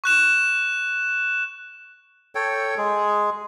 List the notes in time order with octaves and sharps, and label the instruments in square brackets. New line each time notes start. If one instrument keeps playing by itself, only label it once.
[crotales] C#6 F#6 E7
[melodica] A4 C#5 G5
G#3 G#4